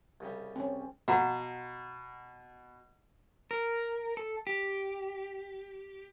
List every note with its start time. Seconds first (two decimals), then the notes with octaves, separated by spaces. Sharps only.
0.20 C2 C#3 G3
0.56 C4 C#4
1.08 B2 F5 F#5 A#5
3.51 A#4
4.17 A4
4.47 G4